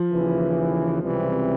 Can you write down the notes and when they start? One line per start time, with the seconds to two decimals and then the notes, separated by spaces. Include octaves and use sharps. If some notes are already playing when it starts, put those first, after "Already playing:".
Already playing: F3
0.11 D#2 C#3 E3
1.02 C#2 C3 E3 G3 C4